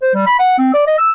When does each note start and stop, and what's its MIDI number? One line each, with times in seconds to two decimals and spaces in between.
0.02 0.12 72
0.15 0.25 55
0.26 0.39 83
0.39 0.54 78
0.58 0.73 60
0.74 0.86 74
0.87 0.97 75
0.98 1.10 88